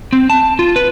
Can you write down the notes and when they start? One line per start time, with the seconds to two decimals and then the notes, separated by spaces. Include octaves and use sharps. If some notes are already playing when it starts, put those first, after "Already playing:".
0.13 C4
0.30 A5
0.59 F4
0.76 B4